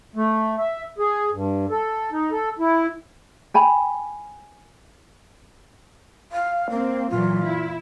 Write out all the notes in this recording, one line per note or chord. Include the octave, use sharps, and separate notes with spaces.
A3
E5
G#4
G2
A4
D#4
A4
E4
G5 G#5 B5
F5
A#3 C4
A#2 E3 F#3 F4
E4